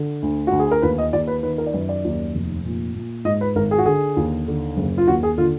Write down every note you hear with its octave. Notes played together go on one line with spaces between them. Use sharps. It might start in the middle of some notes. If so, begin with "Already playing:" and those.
Already playing: D3
D2
D2 F#4
G#4
A#4
D#2 B4
D#5
D#2 D5
B4
D#3 B4
A#4
D5
F#2 B4
D5
D#2
F1
A#2
A#2
G#2 D#5
B4
G#1 A#4
G#4
F#4
D3 G#4
D#2
D3
F#1
F4
D#2 F#4
G#4
D3 F4